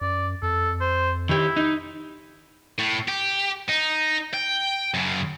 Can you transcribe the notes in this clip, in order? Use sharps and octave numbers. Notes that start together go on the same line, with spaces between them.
F#2 D5
F2 A4
C5
D#3 E4 G4
D#4
A2
G4
D#4
G5
F#2 C#3